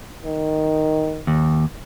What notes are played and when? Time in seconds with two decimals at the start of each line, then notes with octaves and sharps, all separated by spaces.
0.25 D#3
1.27 D#2